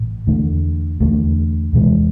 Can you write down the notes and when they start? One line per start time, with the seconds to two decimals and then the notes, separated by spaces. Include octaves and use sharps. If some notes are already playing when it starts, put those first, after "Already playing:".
Already playing: A1 G#2
0.27 E2 D3 A3
1.00 E2 D3 A3
1.73 E2 C3 E3 G#3